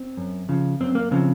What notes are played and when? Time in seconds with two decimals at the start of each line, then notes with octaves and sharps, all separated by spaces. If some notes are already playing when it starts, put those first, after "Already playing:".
Already playing: C4
0.17 F#2
0.49 C#3 F3
0.80 F#2 C4
0.95 A#3
1.11 C#3 F3 C4